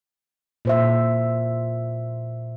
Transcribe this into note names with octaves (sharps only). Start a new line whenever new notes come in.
A#2 C5 E5